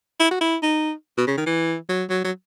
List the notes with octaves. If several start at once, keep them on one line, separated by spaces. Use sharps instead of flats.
E4
F#4
E4
D#4
B2
C#3
D#3
E3
F#3
F#3
F#3